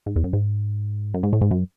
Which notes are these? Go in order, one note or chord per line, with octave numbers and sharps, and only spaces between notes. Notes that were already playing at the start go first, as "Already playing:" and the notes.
G#2
E2
F#2
G#2
F#2
G#2
A2
G#2
F#2